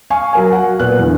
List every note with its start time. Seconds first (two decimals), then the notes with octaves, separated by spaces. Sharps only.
0.10 F5 G#5 C#6
0.33 F#3 A#4 G#5
0.52 F#5
0.80 A#2 B3 F#6
0.99 E2 D3